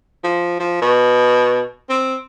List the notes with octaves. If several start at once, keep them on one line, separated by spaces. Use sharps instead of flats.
F3
F3
B2
C4